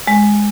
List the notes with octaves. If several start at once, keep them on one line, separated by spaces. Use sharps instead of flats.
G#3